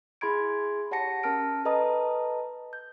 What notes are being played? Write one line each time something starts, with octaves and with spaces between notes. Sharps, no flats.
E4 G#4 B5 C6 G#6 D7
G4 C#5 F#5 A5 A#6 C#7
C#4 A#4 A5 F6 D7
A4 B4 D#5 A5 A#5 D#6
G6